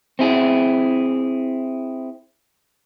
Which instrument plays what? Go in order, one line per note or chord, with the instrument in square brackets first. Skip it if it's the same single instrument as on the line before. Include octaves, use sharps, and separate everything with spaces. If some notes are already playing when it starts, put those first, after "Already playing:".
[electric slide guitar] C4 E4 G#4